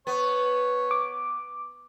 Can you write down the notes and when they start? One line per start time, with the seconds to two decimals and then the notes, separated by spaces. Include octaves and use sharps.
0.07 B3 C#5
0.91 D6